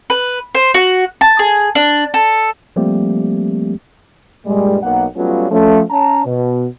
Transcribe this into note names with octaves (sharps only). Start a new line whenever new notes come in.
B4
C5
F#4
A5
G#4
D4
A4
F3 G3 A3 A#3 C4 G4
G2 A#2 G3 G#3
B1 A#3 F#5
F#3 G3 A3 B3 C#4 F4
F3 A3 C#4
C#4 A5 A#5
B2